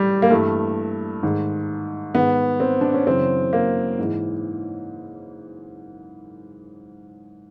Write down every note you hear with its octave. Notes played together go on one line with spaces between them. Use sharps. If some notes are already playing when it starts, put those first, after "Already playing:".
Already playing: A2 E3 G3
A#3
G2 E3 A3
G#2 D#3
G#2 D#3 B3
C4
D4
C#4
F#2 C#3 E3 C4
A#3
G#2 E3